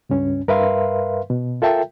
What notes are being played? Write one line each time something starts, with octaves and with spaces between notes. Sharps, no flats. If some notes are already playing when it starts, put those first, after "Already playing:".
C#2 G2 C#4
G2 A#4 B4 E5 F5 C6
B2
F4 A4 A#4 E5 G5 A5